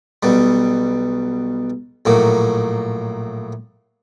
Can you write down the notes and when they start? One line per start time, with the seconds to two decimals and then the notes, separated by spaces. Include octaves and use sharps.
0.23 B1 B2 G3
2.05 A#1 A2 F#3 A#3